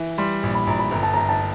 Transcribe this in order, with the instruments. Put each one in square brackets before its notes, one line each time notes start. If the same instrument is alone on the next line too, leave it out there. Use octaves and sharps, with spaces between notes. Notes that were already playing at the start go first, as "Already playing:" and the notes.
Already playing: [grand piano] E3
[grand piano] G3 [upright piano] C6
[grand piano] A#1
[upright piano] B5
[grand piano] A#1 [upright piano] A#5
[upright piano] B5
[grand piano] G1 [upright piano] A#5
[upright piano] A5
[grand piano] G1 [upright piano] A#5
[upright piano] A5